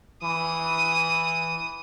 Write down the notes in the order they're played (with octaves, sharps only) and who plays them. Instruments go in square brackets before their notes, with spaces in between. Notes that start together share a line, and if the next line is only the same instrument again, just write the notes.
[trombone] E3 [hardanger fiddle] D#6